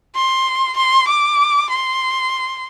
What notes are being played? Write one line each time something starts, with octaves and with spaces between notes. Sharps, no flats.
C6
C6
D6
C6